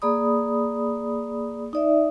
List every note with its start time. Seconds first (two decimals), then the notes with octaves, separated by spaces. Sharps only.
0.02 A#3 G#4 D5 B5 D#6
1.73 D#4 D5 E5